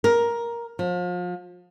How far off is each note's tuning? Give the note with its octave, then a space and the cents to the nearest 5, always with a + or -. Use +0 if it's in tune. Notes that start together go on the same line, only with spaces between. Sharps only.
A#4 +10
F3 +35